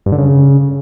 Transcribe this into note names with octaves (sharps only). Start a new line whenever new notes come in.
G2
D3
C#3